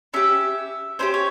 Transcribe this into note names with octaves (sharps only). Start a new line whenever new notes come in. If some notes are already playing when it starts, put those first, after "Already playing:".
C#4 G4 E5
C#4 E4 G4 C5
C#5